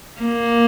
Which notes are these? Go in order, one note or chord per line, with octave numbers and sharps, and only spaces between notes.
A#3